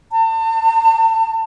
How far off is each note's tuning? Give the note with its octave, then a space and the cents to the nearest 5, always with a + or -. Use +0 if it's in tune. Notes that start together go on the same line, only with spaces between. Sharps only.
A5 +35